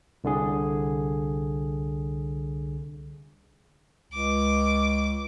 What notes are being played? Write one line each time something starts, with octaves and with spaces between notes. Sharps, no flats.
C2 D3 G#4
C#2 D6